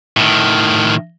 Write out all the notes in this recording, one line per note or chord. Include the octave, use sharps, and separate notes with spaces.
A2 D#3